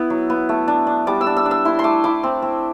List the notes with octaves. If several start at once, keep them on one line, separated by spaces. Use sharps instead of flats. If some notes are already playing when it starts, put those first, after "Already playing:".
Already playing: B3 E4
F#3
B3
A3
D4
D4
G3 D6
E6
D4
E6
D4
E6
E4 C6
C6
A3 D6
E4 D6
C4
C4